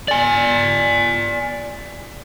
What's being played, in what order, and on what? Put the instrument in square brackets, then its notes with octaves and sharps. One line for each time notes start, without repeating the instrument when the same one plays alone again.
[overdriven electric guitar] D5 G#5